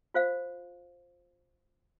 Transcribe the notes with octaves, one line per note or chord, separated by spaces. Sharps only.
F4 C5 F5